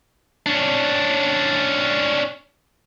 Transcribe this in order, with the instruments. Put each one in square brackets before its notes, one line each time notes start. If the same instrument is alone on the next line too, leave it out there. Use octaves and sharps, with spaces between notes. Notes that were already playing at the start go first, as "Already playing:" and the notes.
[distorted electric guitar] C#4 D4